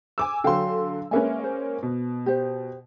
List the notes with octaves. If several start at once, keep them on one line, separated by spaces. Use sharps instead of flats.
G#5 D6 E6
D3 F#3 F5 G5 G#5 C6
G#3 A#3 C#4 B4 E5 G#5
C5
B2
G4 C5